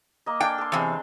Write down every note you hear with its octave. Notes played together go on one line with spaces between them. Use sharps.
A#3 D#5
D4 F5 G5 G#5
A4 C6
E2 C3 G#3 C4